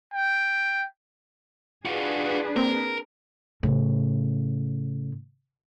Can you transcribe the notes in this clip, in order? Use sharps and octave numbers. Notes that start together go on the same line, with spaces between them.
G5
D4 F4 F#4 G#4 B4
A#3 C4 A#4
A2 C#3